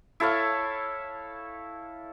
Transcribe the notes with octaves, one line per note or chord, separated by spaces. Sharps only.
E4 A4 C#5 F5